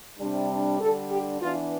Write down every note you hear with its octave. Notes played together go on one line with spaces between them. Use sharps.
C3 G3 D4
D3 G3 D4 A4
G4
E3 B3 D4 F4